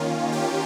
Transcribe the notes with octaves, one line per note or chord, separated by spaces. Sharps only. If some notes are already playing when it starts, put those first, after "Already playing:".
Already playing: D#3 A#3 C#4 F4
G4